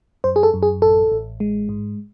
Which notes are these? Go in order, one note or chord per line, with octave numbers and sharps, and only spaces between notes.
F#2 C5
G#4
A4
F#2
G#4
A1 A4
A1
G#3
G#2